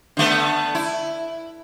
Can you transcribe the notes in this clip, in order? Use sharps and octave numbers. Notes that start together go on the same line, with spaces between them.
D3 A3 B3
E4